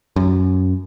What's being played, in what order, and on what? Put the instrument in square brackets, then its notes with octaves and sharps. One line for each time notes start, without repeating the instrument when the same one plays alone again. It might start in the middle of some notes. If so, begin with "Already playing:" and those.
[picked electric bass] F#2